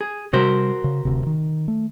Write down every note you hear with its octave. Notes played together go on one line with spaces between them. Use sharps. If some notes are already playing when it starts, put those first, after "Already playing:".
G#4
C3 G3 F#4 A#4 C5
C#3
D1 D2 C3
D#3
A3